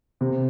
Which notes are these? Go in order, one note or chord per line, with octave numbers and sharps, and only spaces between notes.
C3